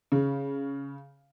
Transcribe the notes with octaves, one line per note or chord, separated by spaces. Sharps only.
C#3